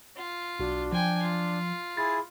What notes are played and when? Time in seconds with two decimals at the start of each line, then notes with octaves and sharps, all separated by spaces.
0.16 F4
0.59 B1 D4 F#4
0.92 F3 G5 G#5
1.23 F4
1.97 E4 G#4 A6